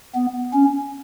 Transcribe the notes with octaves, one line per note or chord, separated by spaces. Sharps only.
B3
C#4